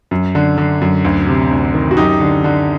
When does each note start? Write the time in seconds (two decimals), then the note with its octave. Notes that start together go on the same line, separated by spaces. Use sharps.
0.11 F#2
0.35 D3
0.58 D3
0.81 F#2
1.05 D2
1.27 C3
1.51 D2
1.74 D#3
1.91 F#4
1.97 F#2 D#4 G4
2.21 D3
2.44 D3